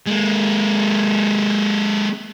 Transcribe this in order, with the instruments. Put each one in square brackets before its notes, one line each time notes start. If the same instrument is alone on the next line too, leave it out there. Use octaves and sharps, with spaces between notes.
[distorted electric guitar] G#3 A#3